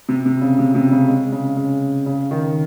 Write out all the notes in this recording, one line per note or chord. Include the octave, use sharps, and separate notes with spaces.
C3
C3
C#3
C3
C3
C#3
G#3
C#3
C#3
C#3
D#3